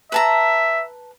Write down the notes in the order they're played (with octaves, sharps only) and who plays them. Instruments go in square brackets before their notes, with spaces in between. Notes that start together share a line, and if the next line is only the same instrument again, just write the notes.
[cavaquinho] B4 A5 A#5 [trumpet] E5